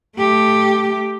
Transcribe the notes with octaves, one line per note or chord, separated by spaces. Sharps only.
A3 G4